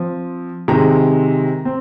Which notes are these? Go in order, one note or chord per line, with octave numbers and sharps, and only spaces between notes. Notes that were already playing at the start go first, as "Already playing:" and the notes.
Already playing: F3 C4
C3 D#3 G#3 C4 A#5
C4